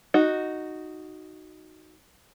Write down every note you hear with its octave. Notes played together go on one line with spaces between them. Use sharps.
D#4 F#4